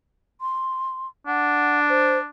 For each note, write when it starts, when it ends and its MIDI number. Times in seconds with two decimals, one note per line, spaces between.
0.41 1.07 84
1.27 2.29 62
1.27 1.80 78
1.89 2.18 72